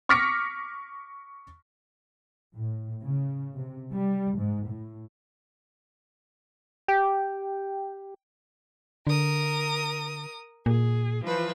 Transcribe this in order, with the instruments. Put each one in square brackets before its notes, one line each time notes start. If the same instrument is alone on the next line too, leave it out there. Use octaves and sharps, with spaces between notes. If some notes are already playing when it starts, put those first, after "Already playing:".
[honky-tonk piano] C#6 D6 F6 A#6 B6 C#7
[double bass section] A2
C#3
C3
G3
G#2
A2
[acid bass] G4 [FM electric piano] G5
[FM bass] D3 [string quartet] A#4 D#6
[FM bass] A#2 [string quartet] G#4
[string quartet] E3 F3 B4